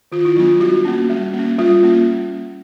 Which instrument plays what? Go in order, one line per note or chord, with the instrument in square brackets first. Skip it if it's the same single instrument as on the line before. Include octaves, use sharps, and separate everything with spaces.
[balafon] D#3 F4
E4
F#3 B3 D4 F4
G3 F#4
A#3 C#4
G3
A#3
C#4
G3 F4
A#3 C#4